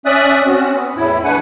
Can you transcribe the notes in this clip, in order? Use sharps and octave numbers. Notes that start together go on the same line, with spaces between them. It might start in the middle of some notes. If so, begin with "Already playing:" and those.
C#4 D5 E5 D#6 F#6
C4 C#4 F#4
B3
E2 A2 E4
E2 A3 D4 B4 F#5 G#5